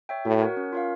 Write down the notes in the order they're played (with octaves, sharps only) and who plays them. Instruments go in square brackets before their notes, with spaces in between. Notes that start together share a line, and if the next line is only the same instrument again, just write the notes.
[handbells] C#5 E5 G5
[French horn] A2 [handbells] F#4
[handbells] A#4 C#5 F#5
C#4
F4 A#4 C#5 F5